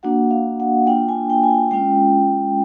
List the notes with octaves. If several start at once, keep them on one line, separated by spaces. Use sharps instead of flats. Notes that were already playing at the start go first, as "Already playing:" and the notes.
A#3 D4 F#4 F#5
F5
F#5
A#3 D4 F4 G5
G#5
G5
G#5
G5
G#3 C#4 F4 G5